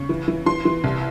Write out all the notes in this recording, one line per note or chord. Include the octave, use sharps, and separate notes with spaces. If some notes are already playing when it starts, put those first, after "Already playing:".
Already playing: C#3 C#6
E3
E3
E3 C6
E3
C2